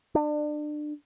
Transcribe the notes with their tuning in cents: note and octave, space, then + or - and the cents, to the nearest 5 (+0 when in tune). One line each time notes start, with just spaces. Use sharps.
D4 +30